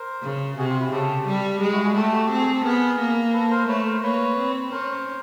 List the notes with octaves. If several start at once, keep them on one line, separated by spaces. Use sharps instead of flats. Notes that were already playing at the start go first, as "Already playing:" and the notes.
Already playing: A#4 C5
C#3
C3 F#4 G#4
F4 G4
E4 F#4
C#3 G4 A4
G3
G#3
E4 F#4
F#4 G#4
A3 G4 A4
F#4
C4 G4
G#4
A4
B3 G#4 A#4
A#3
A4 B4
A#4 C5
A3 B4 C#5
A#4 C5
A#3 B4 C#5
C4
C#4 A#4 C5